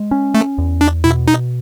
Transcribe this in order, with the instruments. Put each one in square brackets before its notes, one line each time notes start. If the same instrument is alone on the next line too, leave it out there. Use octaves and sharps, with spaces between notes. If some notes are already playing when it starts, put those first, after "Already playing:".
Already playing: [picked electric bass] G#3
C#4
[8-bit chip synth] A3
[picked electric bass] E2
[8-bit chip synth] D4
[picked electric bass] B2 [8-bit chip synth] E4
[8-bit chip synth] D#4